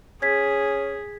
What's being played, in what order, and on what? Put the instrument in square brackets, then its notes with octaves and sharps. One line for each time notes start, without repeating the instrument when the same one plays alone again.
[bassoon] C#4 [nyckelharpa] G#4 [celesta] G#6 B6